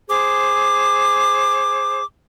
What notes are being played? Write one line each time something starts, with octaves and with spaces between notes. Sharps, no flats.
G#4 C5 D6